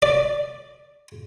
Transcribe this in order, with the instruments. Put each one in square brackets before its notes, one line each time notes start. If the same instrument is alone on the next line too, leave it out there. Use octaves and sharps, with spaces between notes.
[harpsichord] D5